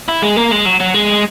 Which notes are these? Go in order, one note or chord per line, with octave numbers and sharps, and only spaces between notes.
E4
G#3
A#3
G#3
F#3
F#3
G#3